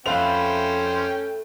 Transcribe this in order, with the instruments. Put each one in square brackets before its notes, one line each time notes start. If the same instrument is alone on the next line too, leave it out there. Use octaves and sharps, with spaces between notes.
[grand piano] F2 F5 F7 [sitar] A3 B4 [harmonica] C#4 G5 [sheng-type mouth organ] C5